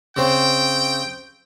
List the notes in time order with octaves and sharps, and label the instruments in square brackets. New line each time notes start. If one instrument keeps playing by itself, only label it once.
[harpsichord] C#3 C4 [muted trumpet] G5